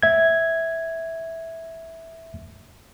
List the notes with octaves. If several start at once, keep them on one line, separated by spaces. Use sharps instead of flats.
E5 G#6